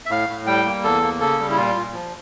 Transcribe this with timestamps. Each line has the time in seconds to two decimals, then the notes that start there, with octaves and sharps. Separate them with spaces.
0.06 E5
0.10 A2 F5
0.29 A2
0.47 G3 G5
0.65 A#3
0.84 E2 A4
1.03 A#3
1.20 C#3 A4
1.40 G3
1.50 E4
1.57 A#2 F4
1.76 A#2
1.94 F3